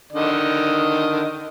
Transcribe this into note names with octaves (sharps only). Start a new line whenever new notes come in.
D3 D#3 D#5